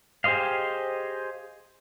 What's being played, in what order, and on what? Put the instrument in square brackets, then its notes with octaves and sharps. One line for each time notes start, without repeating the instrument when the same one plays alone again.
[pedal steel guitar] G4 G#4 C5 D#5 F5